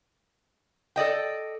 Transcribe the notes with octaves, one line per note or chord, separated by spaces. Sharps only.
A4 D5 D#5 G5